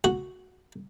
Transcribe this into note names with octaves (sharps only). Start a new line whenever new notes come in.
F#4